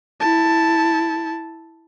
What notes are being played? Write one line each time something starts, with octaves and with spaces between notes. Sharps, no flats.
E4 A5